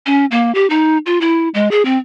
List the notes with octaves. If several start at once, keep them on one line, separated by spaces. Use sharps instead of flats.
C#4
A#3
G4
D#4
F4
E4
G#3
G#4
C4